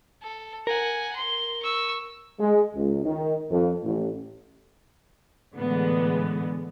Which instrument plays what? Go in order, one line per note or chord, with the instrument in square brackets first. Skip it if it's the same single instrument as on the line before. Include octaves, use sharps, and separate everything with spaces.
[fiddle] A4
[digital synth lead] A#4 [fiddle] F#5 G#5
[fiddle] C6
C#6 E6
[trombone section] G#3
C#2
D#3
F2
A1
[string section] A2 D3 E3 G#3 B3